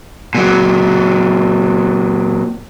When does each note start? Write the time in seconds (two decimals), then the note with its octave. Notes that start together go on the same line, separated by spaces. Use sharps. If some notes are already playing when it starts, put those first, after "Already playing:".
0.35 A#2 F#3